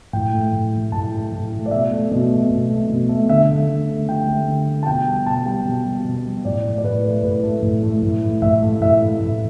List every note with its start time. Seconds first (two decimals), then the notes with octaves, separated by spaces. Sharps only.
0.13 A2 G5
0.33 A3
0.52 A2
0.73 A3
0.92 A2 A5
1.12 A3
1.32 A2
1.52 A3
1.66 D5
1.71 B2 E5
1.91 A3
2.11 B2
2.31 A3
2.51 B2
2.70 A3
2.89 B2
3.09 A3
3.29 D3 E5
3.49 A3
3.69 D3
3.88 A3
4.08 D3 G5
4.27 A3
4.48 D3
4.67 A3
4.83 A5
4.86 B2 G5
5.07 G3
5.26 B2 A5
5.45 G3 G5
5.65 B2
5.85 G3
6.05 B2
6.25 G3
6.45 A2 D5
6.64 A3
6.78 D5
6.84 A2 B4
7.04 A3
7.23 A2 B4
7.43 A3
7.62 A2
7.82 A3
8.02 A2
8.23 A3
8.42 A2 E5
8.62 A3
8.81 A2 E5
9.01 A3
9.20 A2